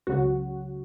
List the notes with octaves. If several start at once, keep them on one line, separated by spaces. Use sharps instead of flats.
C#2 C#3 F#3 F#4